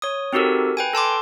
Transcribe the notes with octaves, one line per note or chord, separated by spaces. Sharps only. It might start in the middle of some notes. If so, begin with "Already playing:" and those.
C#5 D#6
C4 D#4 F#4 G4 A4 A#4
B4 G5 G#5
A4 A5 C6 D6